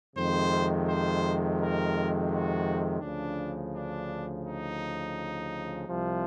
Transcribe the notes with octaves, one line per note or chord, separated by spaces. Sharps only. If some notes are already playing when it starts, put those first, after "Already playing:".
F2 C3 D#3 G#3 C5
C5
A#4
F#4
D2 C#3 F3 D4
D4
D#4
C2 C3 F3